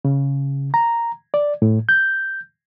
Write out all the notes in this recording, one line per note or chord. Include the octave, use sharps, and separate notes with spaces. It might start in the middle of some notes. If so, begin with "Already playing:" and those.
C#3
A#5
D5
A2
G6